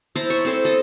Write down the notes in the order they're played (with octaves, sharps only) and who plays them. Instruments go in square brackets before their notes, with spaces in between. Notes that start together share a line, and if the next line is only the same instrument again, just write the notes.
[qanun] E4 C5 A5 A#5
C#5
C4 E4 A4 C5
A4 D#5